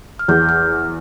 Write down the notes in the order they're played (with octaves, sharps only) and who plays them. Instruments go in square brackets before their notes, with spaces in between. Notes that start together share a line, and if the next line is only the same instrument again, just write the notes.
[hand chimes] F6
[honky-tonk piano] E2 [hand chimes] G6
[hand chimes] F6